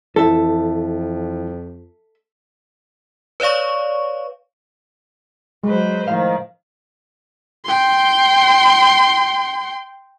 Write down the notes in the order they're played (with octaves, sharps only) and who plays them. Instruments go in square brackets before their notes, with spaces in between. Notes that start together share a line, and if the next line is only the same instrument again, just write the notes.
[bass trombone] F2 [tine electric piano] E3 E4 [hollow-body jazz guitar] A4 E5
[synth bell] B4 C#5 D5 F5 C#6
[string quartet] F#3 B4 C5 [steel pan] G#3
[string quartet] A2 D#3 [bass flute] F3 [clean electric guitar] F5
[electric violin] G5 C6